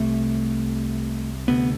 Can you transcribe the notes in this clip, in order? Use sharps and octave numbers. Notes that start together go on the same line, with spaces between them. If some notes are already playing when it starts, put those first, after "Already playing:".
Already playing: C2 C3 A3
D2 C3 B3